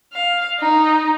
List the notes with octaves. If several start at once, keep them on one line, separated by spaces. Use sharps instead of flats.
F5
D#4